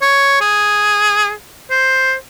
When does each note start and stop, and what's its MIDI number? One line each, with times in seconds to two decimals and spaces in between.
0.02 0.41 73
0.41 1.32 68
1.71 2.14 72